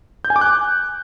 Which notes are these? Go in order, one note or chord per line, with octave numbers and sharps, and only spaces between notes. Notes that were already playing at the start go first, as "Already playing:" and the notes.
G6
G#5
D6
F#6